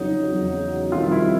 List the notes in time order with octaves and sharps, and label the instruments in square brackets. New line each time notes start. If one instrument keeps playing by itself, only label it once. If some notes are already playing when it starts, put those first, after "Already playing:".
Already playing: [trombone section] F2 C#3 F#3 [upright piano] D#4
[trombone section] E2 C#3 F#3
[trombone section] F2 C3 D#3 G3 [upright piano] F4
[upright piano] E4